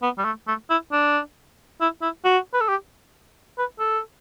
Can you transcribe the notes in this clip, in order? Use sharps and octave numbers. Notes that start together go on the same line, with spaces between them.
B3
G3
A3
A3
E4
D4
E4
E4
F#4
B4
A4
G4
B4
A4